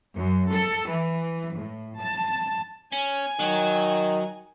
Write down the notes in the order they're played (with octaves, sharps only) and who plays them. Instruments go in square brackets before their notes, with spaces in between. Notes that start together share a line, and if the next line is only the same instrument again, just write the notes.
[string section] F#2
A4
E3
A2
A5
[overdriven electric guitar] C#4 [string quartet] G#5
[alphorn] D#3 [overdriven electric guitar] F#3